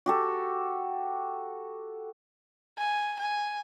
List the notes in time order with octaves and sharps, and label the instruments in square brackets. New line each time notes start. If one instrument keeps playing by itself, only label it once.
[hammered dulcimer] F#4 G4 A4
[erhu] G#5
G#5